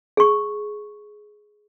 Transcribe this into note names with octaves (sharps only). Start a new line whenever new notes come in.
G#4 C#6